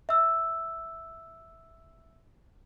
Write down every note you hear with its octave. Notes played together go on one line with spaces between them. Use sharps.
E5 E6